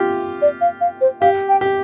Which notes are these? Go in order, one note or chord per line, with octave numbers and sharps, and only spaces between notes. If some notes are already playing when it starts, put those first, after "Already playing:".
Already playing: F4 G4
D5
F5
F5
C5
G4 F5
G5
G4